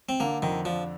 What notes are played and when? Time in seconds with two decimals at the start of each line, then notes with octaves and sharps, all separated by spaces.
0.09 C4
0.20 D3 A#3
0.42 F2 D#3
0.65 F3 D4